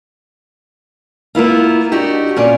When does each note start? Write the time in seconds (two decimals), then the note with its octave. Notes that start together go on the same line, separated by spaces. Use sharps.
1.35 A#3 B3 E4 F4
1.92 D4 D#4 F#4 G4
2.36 A#2 C#4 F4 D5